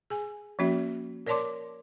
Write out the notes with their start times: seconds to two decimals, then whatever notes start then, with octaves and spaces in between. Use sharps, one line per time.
0.10 G#4 G#5
0.59 F3 A#3 C#4 F#4 E5
1.27 A#4 C#5 D5 A5 C6 D6